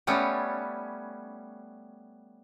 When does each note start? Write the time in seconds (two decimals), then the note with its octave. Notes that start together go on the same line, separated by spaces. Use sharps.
0.07 G3 A3 B3 C#4